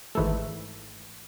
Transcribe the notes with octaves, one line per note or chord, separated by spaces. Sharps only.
G#1 G#2 E3 A3